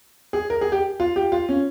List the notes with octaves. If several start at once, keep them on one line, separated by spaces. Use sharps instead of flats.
G#4
A#4
G#4
G4
F4
G4
F4
C#4